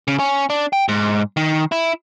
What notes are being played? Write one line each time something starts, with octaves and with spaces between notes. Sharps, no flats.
C#3
C#4
D4
G5
G#2
D#3
E4